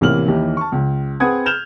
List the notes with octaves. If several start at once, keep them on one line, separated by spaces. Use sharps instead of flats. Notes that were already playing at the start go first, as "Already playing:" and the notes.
A1 C3 E3 A#3 F6 F#7
D#2 E3 D#4 G4
A5 C#6
C#2
C4 G#4 B4 F#5 D#6 G#6
F6 G6 E7 F7 G7